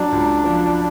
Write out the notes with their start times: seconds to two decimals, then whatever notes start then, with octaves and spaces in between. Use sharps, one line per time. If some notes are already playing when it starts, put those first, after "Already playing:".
Already playing: F#3 D4
0.12 C#2
0.44 F3